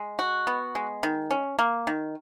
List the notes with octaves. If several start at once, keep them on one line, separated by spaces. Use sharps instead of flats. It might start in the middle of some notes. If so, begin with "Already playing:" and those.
Already playing: G#3
F#4
B3
G#3
D#3
C#4
A#3
D#3